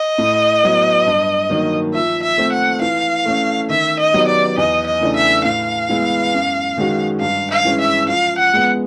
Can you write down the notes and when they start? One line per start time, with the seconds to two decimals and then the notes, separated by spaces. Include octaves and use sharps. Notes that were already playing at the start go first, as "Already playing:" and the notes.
Already playing: D#5
0.18 A2
0.63 F#3 B3
1.07 G2
1.50 D#3 F#3 A#3
1.94 F3 E5
2.23 E5
2.38 A3 C4
2.52 F#5
2.81 E3 F5
3.26 A3 C#4
3.69 D#3 E5
3.99 D#5
4.14 F#3 B3 D#4 G4
4.28 D5
4.58 E2 D#5
4.87 D#5
5.01 C#3 E3 A3 D4
5.16 E5
5.45 A2 F5
5.89 E3 G#3 B3 E4
6.34 F#2
6.77 D#3 G#3 C#4 F#4
7.21 G2 F5
7.51 F5
7.65 E3 G#3 C#4
7.80 E5
8.09 F3 F5
8.38 F#5
8.53 G#3 B3